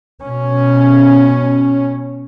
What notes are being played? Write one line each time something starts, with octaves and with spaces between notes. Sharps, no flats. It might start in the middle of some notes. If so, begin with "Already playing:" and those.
B2 C#4